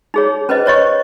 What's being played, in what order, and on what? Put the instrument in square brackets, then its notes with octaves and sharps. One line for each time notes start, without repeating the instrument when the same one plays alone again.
[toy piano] D#4 G#4 C#5
C#4 B4 C5 D#5
C5 C#5 D#5 C#6